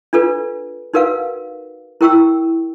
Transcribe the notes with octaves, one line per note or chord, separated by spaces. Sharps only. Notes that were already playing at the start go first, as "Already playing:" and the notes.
D4 F4 A4 B4
D#4 F#4 A#4 B4 F5 F#5
E4 A#4 G5 C#6 E6